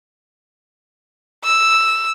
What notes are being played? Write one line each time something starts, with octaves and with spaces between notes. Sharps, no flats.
E6